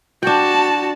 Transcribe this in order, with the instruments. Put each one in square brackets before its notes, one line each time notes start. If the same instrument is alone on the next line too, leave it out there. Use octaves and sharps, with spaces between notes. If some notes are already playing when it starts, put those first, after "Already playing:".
[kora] D4 G5 [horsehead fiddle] F#4 A5